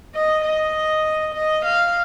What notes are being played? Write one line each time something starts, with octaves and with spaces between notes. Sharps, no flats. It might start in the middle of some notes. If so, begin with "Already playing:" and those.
D#5
D#5
D#5
F5